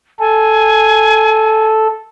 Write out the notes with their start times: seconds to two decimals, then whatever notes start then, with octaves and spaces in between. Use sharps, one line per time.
0.19 A4 G#5